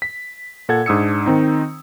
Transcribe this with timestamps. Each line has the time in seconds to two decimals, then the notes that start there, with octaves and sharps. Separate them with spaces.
0.02 B6
0.69 A#2 A4 F#5 G#6
0.86 G#2 D4 D#6 E6 G#6 C#7
1.26 D#3 C4 D#4